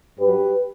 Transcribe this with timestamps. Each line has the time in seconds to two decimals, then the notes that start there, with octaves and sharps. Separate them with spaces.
0.20 G2 F#3 G4 B4